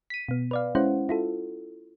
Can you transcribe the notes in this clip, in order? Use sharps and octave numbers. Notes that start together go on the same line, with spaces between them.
B6 D#7
B2 B3
B4 D5 F5
G#3 C#4 E4 C5 F#5
E4 F4 A4